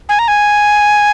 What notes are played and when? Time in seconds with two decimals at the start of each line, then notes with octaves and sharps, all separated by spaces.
0.09 G#5
0.19 A#5
0.28 G#5